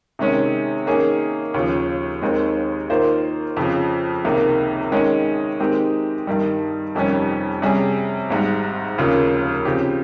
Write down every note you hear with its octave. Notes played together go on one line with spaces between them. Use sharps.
C3 D#3 G#3 C#4
D#3 A#3 C#4 G#4
D#2 C#3 F3
D#2 D#3 G#3 C4
D#3 A#3 F4 C5
F2 C#3 F3
C#2 C3 D#3 A#3
D#3 G#3 C#4
D#3 G#3 C4 D#4 G4
G2 D#3 G3
F1 F2 D#3 G3 C#4
C3 G3 C#4 G#4
G#1 G#2 G3
F1 D#2 C#3 F3 A#3
C#3 F3 C4 G4